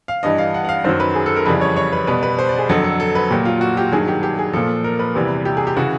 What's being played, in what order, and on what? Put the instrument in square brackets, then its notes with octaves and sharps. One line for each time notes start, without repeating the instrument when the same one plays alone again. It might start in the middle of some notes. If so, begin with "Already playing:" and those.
[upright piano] F5
G2 E3 G3 D#5
F5
F#5
F#5
F5
F#2 D#3 F#3 C5
B4
G#4
A4
A#4
F2 C#3 E3 G3 B4
C#5
C#5
B4
B2 G3 B4
B4
C5
D5
G#4
F2 D3 F#3 A4
A4
A4
B4
A#2 F#3 G4
F4
F#4
G4
G2 D#3 F#3 G#4
G4
G4
G#4
A#2 F3 A4
A#4
B4
E2 C3 E3 G3
G4
G#4
G4
C#3 E3 F#4